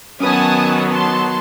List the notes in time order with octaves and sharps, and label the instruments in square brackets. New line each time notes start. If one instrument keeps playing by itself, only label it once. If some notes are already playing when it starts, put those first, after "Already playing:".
[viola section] D#3 F#3 B3 [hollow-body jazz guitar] C#4 B4 [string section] G#5 A5 D#6
[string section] A5 C6